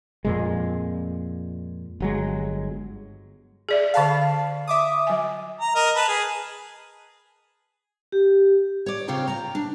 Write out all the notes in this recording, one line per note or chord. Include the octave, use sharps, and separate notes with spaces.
F2 A#2 G#3
G1 F#3 G#3
G#4 D5 E5
D3 G#4 A4 F5 A5 B5
E5 D6 D#6
F#3 G#5
A#5
A#4 D#5
B4 A5
G#4
G4
C#5 D5
C#3 C4 F4 G4 C#5 A#5
G5 A#5
D4